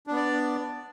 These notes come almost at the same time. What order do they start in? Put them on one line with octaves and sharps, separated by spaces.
D4 B3 D5